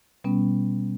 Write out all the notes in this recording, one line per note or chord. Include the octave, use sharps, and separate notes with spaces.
B2 G3 B3 C#4